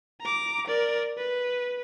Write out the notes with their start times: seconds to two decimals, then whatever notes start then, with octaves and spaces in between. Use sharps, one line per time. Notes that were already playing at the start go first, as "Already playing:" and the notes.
0.21 A#5 D6
0.67 A#4 D5
1.17 B4